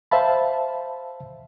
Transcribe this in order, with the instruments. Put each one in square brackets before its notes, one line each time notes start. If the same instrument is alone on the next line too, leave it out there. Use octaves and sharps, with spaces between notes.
[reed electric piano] C5 E5 F5 A5 B5